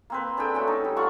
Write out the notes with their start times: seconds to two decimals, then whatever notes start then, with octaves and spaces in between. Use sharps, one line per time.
0.10 A#3 C4 B4
0.37 D4 G#4 A4 G5
0.54 A3 C#4 F#4
0.67 D#4
0.84 G3
0.96 F4 A4 F#5 C#6